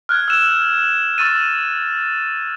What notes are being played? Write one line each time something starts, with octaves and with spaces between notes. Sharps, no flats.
F6 F#6 G#6
E6 E7
C#6 E6 A6 D#7